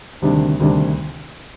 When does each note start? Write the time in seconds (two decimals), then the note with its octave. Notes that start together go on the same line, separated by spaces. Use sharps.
0.22 D2 C3 D#3 G3 D4
0.60 D2 C3 D#3 G3 D4